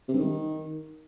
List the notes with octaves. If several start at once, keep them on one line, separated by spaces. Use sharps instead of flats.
C3
G2
D#3